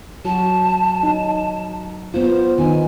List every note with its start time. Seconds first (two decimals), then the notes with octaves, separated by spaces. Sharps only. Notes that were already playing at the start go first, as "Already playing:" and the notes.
0.25 F#3 F#4 A5
1.03 D#4
2.14 B3 F4 C5
2.58 D#3 B3 D#4 G#5